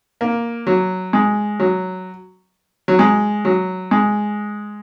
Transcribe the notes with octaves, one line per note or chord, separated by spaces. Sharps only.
A#3
F#3
G#3
F#3
F#3
G#3
F#3
G#3